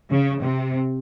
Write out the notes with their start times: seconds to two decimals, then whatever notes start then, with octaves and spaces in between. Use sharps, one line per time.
0.10 C#3
0.42 C3